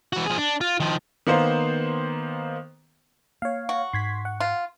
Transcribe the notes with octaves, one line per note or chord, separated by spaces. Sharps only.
E3 F#4
F3 G#4
D4
F4
D#3 F3
D#3 A#3 B3 C5
A#3 C#5 F5
F#4
G#2 C6 G#6 B6
F#5
F4